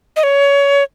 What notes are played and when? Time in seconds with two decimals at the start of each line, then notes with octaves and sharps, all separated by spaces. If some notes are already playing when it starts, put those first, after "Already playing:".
0.16 D#5
0.23 C#5